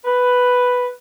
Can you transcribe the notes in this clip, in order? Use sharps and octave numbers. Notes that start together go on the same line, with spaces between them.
B4